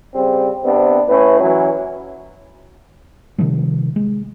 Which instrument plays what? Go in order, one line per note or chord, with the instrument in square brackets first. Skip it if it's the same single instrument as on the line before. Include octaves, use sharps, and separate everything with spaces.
[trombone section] C#3 G3 C4
C3 B3 C4 D4
A2 C#4 B4
E3 F#3 C#4
[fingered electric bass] C3 D#3 F3 G3
G#3